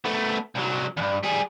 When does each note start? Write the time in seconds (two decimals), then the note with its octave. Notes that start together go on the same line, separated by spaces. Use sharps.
0.05 A3 B3
0.55 C2 F#3
0.97 E2 G2
1.23 G3 G#4